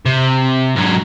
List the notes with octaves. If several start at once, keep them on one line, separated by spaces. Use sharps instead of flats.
C3
G#2 F#3